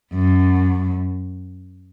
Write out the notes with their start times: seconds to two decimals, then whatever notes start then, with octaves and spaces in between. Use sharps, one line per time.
0.14 F#2